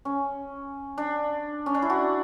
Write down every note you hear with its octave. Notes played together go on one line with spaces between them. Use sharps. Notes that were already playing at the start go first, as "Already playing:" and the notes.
C#4
D4
C#4
D4
E4
F#4